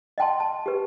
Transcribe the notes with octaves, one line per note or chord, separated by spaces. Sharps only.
D#5 F#5 G5 A5 C6
A5
G4 B4